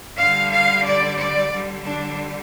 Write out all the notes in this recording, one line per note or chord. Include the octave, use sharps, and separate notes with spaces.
D3 G3 F5
F5
D5
D5
D3 G3
D4